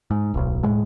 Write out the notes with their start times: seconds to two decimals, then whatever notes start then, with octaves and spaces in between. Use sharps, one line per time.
0.11 G#2
0.34 D1 B1
0.63 A2 G#3